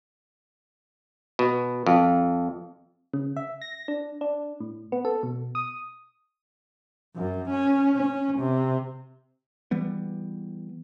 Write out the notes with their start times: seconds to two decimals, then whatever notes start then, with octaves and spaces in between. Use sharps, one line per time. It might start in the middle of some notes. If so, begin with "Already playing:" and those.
1.39 B2
1.86 F2
3.13 C#3
3.37 E5
3.62 A#6
3.88 D4
4.21 D4
4.60 A2
4.92 B3
5.05 A4
5.23 B2
5.55 D#6
7.16 F#2
7.50 C#4
7.95 C#4
8.39 C3
9.71 E3 G3 B3